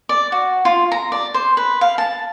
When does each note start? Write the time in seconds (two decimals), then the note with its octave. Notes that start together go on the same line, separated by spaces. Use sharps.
0.09 D5
0.32 F#4
0.65 F4
0.92 A#5
1.12 D5
1.34 C5
1.57 B4
1.81 F5
1.98 A5